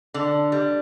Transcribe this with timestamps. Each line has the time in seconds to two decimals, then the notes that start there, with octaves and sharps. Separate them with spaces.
0.14 D3
0.52 G3